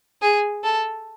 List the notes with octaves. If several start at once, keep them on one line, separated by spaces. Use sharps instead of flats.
G#4
A4